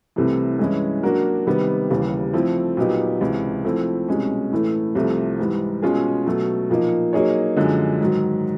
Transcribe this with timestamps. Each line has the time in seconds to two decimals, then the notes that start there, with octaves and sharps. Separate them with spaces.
0.16 C2 C3 E3 A3
0.59 G2 E3 G#3 C#4 E4
1.03 F#3 A#3 D4 F#4 A#4
1.47 C3 D#3 G3 B3
1.90 D#2 C#3 E3 G3
2.33 F3 A3 C4 E4 A4
2.77 A#2 F#3 B3 D#4 G4
3.21 C#2 C3 E3
3.65 F3 A3 C4 E4
4.08 C2 B2 G#3 C#4
4.52 A2 E3 A3
4.95 C2 C3 F3 A3
5.39 G#2 E3 G3
5.82 B2 G#3 C#4 F4 G#4
6.26 B2 F#3 A3
6.70 A#2 F3 A#3 D#4
7.13 F#3 A#3 D#4 G#4 C#5
7.57 F#2 D3 F3 G#3
8.00 G#2 D#3 F#3